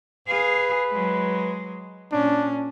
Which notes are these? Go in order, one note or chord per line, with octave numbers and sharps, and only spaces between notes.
G#4 B4 F5
F#3 G#3
A#2 C#4 D4